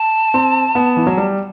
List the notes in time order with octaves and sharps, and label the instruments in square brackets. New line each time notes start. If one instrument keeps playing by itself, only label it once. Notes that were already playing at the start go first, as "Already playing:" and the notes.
Already playing: [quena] A5
[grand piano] C4
B3
E3
F#3
G3